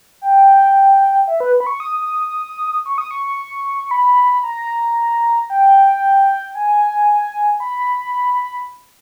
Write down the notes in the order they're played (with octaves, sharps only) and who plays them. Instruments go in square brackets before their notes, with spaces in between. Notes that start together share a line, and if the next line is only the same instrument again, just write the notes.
[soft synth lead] G5
E5
B4
B5
C#6
D#6
C#6
D#6
C#6
C#6
B5
A#5
G5
G#5
B5